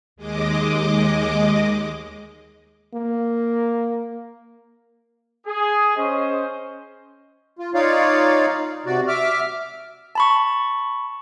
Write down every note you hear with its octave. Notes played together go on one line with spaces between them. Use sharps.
D#2 G#3 D#5 D6
A#3
G#4
C#4 C5 D#5
F4
D#4 F4 C#5 D5 F5
C3 F#4 D5
E5 D6 F6
A5 B5 C#6